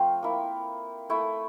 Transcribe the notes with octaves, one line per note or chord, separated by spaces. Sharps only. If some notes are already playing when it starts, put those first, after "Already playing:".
Already playing: F3 A3 C4 F5 G5
A#3 E4
A3 E4